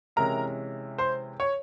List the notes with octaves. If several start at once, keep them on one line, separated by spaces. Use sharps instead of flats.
C3 E3 G#3 C#4 E4 A#4 A#5
C5 C6
C#5 C#6